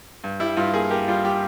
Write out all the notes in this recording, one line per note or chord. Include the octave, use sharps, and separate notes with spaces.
G2
G3 E4
G2 F4
A#3 G#4
A#3 G4
G3 F4
G3 G4